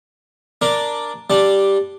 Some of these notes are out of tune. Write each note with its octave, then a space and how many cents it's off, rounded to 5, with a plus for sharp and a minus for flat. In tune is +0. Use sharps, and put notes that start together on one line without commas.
D4 +0 A#4 +0
G3 +0 D4 +0